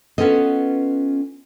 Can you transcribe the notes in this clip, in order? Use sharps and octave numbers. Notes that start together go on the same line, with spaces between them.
B3 C#4 F4 A4 D#5